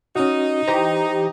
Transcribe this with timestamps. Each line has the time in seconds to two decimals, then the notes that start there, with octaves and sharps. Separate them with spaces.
0.16 C#4 D#4 F#4 D#5
0.68 E3 G4 C5 A#5